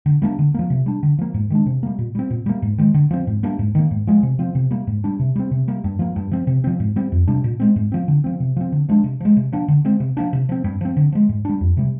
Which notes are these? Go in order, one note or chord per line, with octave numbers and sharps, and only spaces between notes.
D3
G3 A#3 D4
D3
F3 A#3
C3
G3 D4
D3
F3 A#3
G#2
D#3 G#3 D4
C3
G3 A#3
A#2
G3 C4
A#2
G3 A#3
G#2
D#3 G#3
D3
F3 C4
G#2
G3 A#3 D4
G#2
D#3 A#3
G#2
F3 G#3
C3
F3 C4
C3
G3 A#3
G#2
G3 D4
C3
G3 C4
C3
G3 A#3
G2
F3 A#3
G2
F3 C4
C3
F3 C4
G#2
G3 C4
F2
C3 G3 D4
A#2
G#3 C4
G#2
F3 C4
D3
F3 C4
C3
F3 C4
D3
F3 G#3 D4
C3
F3 G#3
C3
F3 A#3 D4
D3
G#3 C4
C3
F3 A#3 D4
C3
F3 C4
G2
F3 C4
D3
F3 G#3
G#2
G3 D4
F2
C3 G3